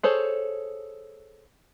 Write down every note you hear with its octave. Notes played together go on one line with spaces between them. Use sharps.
G#4 A4 C5 C#5